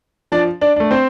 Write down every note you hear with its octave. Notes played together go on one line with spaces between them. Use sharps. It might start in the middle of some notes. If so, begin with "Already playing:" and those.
F3 D4 D5
D4 D5
A3 D4
C4 C5